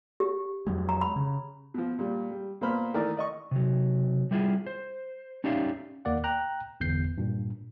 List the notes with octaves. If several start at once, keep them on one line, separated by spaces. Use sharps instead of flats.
G4
F2 F#3 G#3
A#5
B5
C#3
B2 F3
A#2 G3
G3
A#2 A#3 B3 C5 B5 F6
D#3 E3 A3 A#4 D5
D5 D#5 C#6
C3 F#3
G3 A3 E4 F4 G#4
C5
C#4 D#4 G4 D5 E5 F5
D#2 A#3 D5 F#5
G5 A#5 F#6
G1 E2 G6 C7
G2 A#2